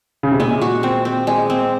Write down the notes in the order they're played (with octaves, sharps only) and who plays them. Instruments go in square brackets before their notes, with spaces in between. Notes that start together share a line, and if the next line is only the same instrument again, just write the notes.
[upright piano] C#3
C3
[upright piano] A#2 [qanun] G#3
[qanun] F#4
C4
C4
G#3
C4